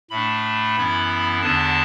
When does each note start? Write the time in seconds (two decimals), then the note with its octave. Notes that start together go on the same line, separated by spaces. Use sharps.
0.10 A2 A3 D4 B5
0.76 F#2 E3 B3 E4
1.42 E2 D3 B3 D4 A5